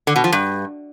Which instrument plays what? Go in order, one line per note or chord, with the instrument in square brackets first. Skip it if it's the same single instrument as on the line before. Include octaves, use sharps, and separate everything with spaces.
[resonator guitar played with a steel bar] D3
B2
F3
G2